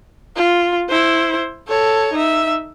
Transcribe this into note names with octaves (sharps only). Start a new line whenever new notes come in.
F4
E4 C5
A4 C#5
D#4 E5